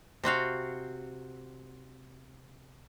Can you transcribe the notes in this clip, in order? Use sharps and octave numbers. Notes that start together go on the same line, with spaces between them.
C3 C4 F#4 F5